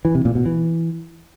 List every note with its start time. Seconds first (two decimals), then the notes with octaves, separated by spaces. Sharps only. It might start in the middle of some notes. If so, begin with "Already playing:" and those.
0.05 E3
0.15 C3
0.25 A#2
0.35 B2
0.46 E3